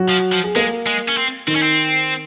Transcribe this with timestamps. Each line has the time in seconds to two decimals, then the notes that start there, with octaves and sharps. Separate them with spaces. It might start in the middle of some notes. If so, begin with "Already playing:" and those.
Already playing: F#3 F#4
0.10 F3
0.33 F3
0.44 G#4
0.56 G#3 A#3 A#4
0.86 G#3
1.08 C#4
1.17 C4
1.47 D#3 C4 D#4
1.56 C#4
1.63 C4